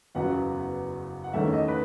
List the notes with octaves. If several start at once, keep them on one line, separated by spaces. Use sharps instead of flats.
F#1 E2 C#3 F#3 B3 F#5
F#5
E2 D#3 A3 C#4 E5
D#5
B4